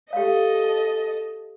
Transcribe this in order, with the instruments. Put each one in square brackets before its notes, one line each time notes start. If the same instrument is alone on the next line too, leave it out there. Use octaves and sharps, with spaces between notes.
[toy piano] G4 F5 [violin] A4 D#5